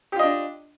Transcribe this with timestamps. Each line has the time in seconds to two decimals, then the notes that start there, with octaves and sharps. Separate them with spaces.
0.12 G4
0.16 F4
0.19 D#5
0.23 D4